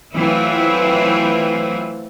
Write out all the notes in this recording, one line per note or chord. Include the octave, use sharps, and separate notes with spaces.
E3 F#3 A3 C4 E4 F4